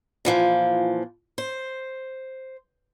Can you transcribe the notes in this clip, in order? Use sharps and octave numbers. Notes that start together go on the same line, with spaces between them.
A#2 E3 F3
C5